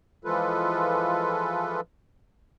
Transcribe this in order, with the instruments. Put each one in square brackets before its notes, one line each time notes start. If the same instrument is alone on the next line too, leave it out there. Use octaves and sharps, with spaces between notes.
[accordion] E3 F3 G#3 F4 A4 B4